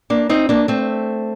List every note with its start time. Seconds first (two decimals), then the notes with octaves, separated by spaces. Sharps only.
0.10 A#3 D4
0.29 C4 D#4
0.49 A#3 D4
0.68 A3 C4